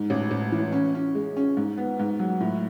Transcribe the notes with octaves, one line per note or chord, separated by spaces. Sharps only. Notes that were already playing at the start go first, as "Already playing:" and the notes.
Already playing: G#2
A1
A1
E3
C#4
C#4
G#3
C#4
G#2
B3
G#2
F#3
A2